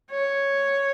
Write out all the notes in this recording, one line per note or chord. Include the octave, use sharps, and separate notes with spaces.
C#5